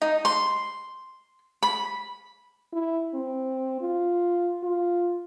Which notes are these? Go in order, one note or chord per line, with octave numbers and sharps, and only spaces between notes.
D#4
C6
B5
E4
C4
F4
F4